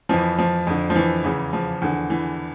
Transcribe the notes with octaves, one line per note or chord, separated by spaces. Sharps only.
F2 E3 F3
F3
F2 D3
F3
E3
E2 C#3 E3
F3
E2 D3
E3